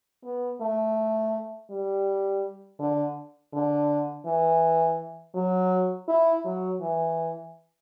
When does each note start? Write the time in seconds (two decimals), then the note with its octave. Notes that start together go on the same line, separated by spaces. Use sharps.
0.24 B3
0.61 A3
1.70 G3
2.80 D3
3.53 D3
4.26 E3
5.35 F#3
6.08 E4
6.44 F#3
6.81 E3